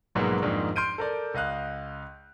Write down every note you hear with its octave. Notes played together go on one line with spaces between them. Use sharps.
A#1 G#2 B2 F#3 G#3 A#3
F2 G#2 D#3 A#3 D4 D#4
C6 F6 G6 D7 D#7
A4 A#4 D5
C#2 D#5 F5 F#6